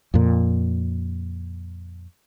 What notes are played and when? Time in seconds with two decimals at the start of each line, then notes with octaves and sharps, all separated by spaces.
0.14 F2 A#2